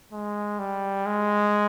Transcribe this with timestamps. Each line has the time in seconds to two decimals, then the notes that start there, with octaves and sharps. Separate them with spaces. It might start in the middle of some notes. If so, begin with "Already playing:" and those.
0.13 G#3
0.59 G3
1.06 G#3